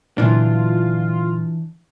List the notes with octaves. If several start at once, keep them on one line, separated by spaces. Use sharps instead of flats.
A#2 D3 E3 F#3 D4 F4